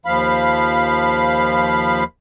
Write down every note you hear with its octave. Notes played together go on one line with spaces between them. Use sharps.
D#2 F3 F5 B5